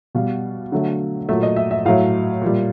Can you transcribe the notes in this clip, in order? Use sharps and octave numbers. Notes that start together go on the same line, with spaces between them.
B2 G3 F5
D3 F#3 A3
A#2 F#3 A3 E5
D#5
E5
E5
A2 F#3 A3 F5
A#2 G3